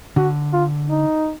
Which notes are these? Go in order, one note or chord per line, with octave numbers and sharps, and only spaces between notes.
D3 F#4
F4
D#4